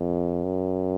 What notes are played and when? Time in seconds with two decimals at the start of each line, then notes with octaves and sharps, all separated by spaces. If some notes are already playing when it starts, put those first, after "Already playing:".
Already playing: F2
0.44 F#2